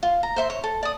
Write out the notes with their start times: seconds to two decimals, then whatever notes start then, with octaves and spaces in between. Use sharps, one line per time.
0.03 F4
0.23 A#5
0.36 C5 E5 C6
0.50 C#5
0.64 A4
0.83 D5 D#6